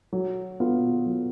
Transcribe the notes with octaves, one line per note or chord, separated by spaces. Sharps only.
F#3
B3 F4
F#3